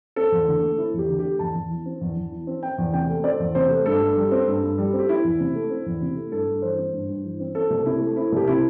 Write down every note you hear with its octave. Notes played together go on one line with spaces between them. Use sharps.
C4 A4
E2
D3
A3
C4 E4
E2 G4
D3
G4
A3
E2 A5
E2
E3
C4
E2
E2
E3
C4
C4 G5
E2
C3 G5
A3
C4 D5
E2
C3 C5
A3
G2 A4
G2
G3
C4
G2
G2
G3
C4
G4
C4 E4
E2
C3
A3
C4
E2
C3
A3
G2 A4
G2
E3 C5
C4
G2
G2
E3
C4
C4 A4
C2
C3 E4
A3
C4 E4
C2 G4
C3 E4